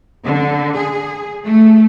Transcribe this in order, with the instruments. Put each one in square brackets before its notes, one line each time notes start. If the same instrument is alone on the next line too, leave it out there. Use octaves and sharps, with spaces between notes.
[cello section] D3
G#4
A3